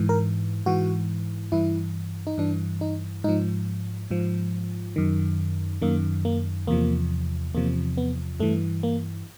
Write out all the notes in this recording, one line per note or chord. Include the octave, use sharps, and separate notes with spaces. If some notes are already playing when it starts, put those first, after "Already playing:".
Already playing: G#2 E3
A#4
G#2 E3 F#4
G2 E3 E4
D#4
G2 E3 D4
D#4
G#2 F3 D#4
G#2 F3
F#2 D#3
F#2 D#3 A#3
A#3
E2 C3 F3 A#3
E2 C3 F3 A#3
B3
G2 E3 A3
A#3